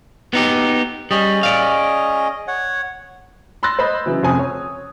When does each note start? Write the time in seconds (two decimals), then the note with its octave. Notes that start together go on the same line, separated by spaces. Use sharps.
0.33 B3 D#4 G4
1.11 G3 C#4 G#4 D#5
1.43 D5 F5
2.48 C#5 F#5
3.63 B5 C6 E6 F#6 A6 A#6
3.79 C5 D#5 B5 C6
4.06 C#3 E3 F#3
4.23 F1 F2 C#3 C4 G#5 D#6
4.39 C#5